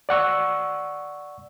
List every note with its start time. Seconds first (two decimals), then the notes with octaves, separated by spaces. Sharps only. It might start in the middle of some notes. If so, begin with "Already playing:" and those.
0.09 D5 F#5 C#6 E6